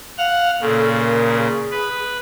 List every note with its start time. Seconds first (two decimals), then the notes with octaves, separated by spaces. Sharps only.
0.18 F5 F#5 F6
0.61 A#2 C#3 A4
0.98 A#4
1.38 G#4
1.71 B4